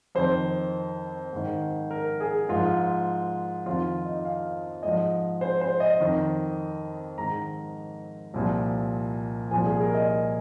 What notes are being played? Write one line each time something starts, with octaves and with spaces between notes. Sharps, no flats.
F2 D#3 C5
G#2 D#3
A#4
G#4
G#2 F3 F4
F2 D#3 F4
D#4
F5
G#2 F3 D#5
C5
C5
D#5
F2 D#3
G#2 D#3 A#5
C2 A#2 F3
C2 A#2 F3 G#5
G#4
A#4
D#5